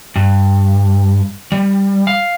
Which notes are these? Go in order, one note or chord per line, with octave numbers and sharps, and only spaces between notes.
G2
G3
F5